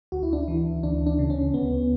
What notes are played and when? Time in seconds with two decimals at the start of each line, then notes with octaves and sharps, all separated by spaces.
0.12 D2 F#4
0.23 E4
0.33 D4
0.43 E4
0.48 E3
0.83 D2 D4
1.07 D4
1.19 C#3
1.30 C#4
1.54 D2 B3